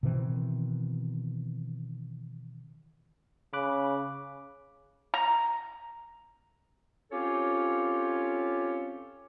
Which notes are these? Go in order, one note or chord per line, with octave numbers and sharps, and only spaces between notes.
B2 D#3 E3 C4
C#3 B5 D6 F#6
A#5
C4 C#4 F4 G4 A4 C#5